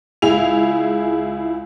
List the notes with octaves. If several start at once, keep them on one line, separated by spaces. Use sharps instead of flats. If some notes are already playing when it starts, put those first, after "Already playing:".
C#2 E4 G#4 F7